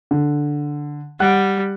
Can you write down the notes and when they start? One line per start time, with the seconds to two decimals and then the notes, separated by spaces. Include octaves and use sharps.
0.11 D3
1.20 G3 F#5 F#6